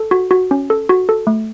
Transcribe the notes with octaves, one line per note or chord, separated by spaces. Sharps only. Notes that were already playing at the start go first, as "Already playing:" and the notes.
Already playing: A4
F#4
F#4
C#4
A4
F#4
A4
A3